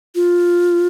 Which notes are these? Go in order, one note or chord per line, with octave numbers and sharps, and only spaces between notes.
F4